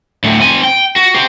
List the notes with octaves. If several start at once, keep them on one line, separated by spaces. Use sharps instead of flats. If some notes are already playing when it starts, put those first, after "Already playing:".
D2 A2
C4 G#5
G5
F#4
G4 C5